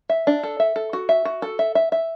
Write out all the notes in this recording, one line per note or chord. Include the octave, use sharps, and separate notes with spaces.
E5
D4
A4
E5
A4
F#4
E5
F#4
A4
E5
E5
E5